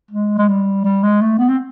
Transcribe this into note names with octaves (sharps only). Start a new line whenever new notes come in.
G#3
G#3
G3
G3
G#3
A3
B3
C4